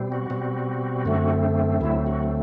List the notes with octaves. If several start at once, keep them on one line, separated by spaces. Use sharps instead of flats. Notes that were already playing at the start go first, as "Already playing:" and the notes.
Already playing: B2 G3 C4
F#4
B2 G3 C4
F#2 D3 A3 C4
D2 D3 F#3 A3 C4 E4
F#4